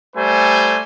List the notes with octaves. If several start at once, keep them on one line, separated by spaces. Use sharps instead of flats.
G3 A3 C5 G#5